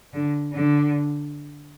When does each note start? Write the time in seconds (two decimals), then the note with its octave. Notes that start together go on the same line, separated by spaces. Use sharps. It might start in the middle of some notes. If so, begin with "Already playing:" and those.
0.13 D3
0.52 D3